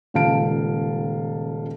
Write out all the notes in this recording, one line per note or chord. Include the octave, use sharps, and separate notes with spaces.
D#1 C#2 F5 A5 D7